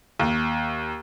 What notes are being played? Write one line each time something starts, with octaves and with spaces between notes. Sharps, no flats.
D#2